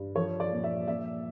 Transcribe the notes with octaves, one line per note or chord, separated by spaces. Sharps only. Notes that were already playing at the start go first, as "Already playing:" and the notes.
Already playing: G2
F3 C#5
D5
A#2
E5
A#2 E5